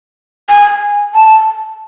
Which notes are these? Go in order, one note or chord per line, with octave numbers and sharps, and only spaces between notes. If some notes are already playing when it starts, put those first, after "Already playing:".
G#5
A5